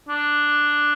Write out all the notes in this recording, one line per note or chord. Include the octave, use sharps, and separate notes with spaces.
D4